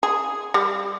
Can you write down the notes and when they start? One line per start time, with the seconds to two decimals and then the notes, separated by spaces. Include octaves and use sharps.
0.03 G#4
0.54 G3